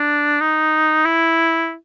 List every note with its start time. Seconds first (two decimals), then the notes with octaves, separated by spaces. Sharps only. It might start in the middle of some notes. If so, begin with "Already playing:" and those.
Already playing: D4
0.41 D#4
1.05 E4